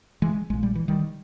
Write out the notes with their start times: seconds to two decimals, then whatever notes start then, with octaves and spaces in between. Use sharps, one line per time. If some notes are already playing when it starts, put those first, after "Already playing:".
0.22 E3 G#3
0.50 A#1 A#2 G#3
0.63 G3
0.75 E3
0.88 D#3 G3